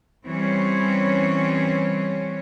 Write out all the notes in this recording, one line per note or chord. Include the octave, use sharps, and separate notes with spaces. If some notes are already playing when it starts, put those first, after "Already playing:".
E3 G3 C4 C#4 C#5